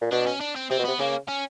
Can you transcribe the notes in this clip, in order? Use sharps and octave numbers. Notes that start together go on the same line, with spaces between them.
A#2
B2 D4
C#4
D4
C4
C3 C4
B2
C3 B3
C#3 A#3
C#4